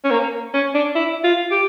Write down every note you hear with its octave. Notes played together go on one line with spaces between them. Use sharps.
C#4
A#3
C#4
D4
E4
F4
G4